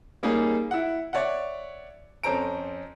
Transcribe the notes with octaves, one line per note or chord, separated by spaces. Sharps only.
G3 A#3 C#4 D#4 G#4
E4 F#5
C#5 D5 E5 F#5
F2 C#4 A4 C5 A#5 D7